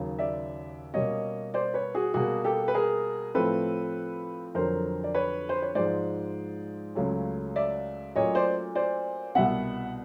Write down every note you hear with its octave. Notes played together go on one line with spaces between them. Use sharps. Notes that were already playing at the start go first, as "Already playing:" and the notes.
Already playing: D#2 C#3 F#3
D5 E5
B2 G3 A#3 C#4 C#5 D#5
C5 D5
B4 C#5
F#4 G#4
B2 G3 A#3 F#4 G#4
G4 A4
B4
G#4 A#4
A2 F3 A3 C4 A4 B4
F2 D3 F#3 A#4 C5
D5
B4 C#5
C5
C#5
G#2 F3 G#3 C5 D5
C#2 C#3 F#3 A3 C#4
D5 E5
A#2 F#3 A3 C#4 C#5 D#5
C5 D5
C5 D5
C2 B2 G3 B3 E5 F#5